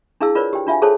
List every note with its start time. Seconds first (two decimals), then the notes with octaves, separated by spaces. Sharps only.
0.21 D4 E4 G#4 F5 A5 E6
0.35 F4 A#4 B4 C#5 D5
0.53 G4 G5
0.67 D4 F4 E5 F5 G#5
0.82 G#4 A4 C5 C#5 A5